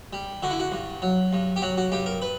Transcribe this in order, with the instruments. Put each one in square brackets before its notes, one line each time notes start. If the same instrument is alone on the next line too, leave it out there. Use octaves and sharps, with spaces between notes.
[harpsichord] G3
D3 F#4
E4
F#4
G2
F#3
G2
G4
F#3 F#4
F#4
G2 G4
A#4
B4